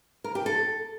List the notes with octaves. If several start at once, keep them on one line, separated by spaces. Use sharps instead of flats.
A#4
G4
A4